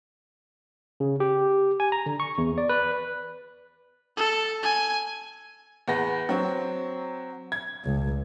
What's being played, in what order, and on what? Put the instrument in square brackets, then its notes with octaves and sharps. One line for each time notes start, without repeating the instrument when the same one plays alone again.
[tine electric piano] C#3
G4
G#5
A#5
D3
C#6
E2
D5
B4
[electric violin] A4
G#5
[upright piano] E2 B3 A#6
F#3 C4
G#6
[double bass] C#2